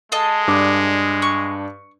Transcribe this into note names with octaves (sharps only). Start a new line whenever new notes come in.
G#3 A4 D#5 F5
G2 D4 D6
C#6